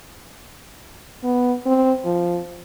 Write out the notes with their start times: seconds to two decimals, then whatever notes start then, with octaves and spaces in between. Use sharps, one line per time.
1.23 B3
1.66 C4
2.05 F3